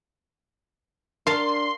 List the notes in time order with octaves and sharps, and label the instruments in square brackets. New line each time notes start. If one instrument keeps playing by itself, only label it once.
[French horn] D4 [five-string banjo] A#4 [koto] F5 A5 [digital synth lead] C6